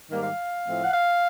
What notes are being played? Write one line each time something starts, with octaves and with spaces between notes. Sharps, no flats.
G#2 D#3 G3 A#3
F5
A2 F3 A3 C4
F#5
F5